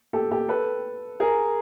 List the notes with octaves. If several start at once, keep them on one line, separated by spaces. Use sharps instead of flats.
G4 A4
G4 A4
A4 B4
G#4 A#4